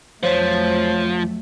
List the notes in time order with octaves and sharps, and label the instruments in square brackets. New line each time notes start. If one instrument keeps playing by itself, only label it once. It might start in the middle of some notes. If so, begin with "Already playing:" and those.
[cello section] F2 F#3 A3 [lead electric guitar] F3 [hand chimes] C5 C#5 B6